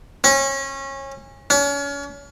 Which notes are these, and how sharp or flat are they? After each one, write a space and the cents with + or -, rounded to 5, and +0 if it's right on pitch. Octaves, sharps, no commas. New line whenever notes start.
C#4 -25
C#4 +35